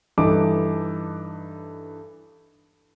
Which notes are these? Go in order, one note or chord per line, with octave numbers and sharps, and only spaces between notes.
G2 E3 D#4 A4 D6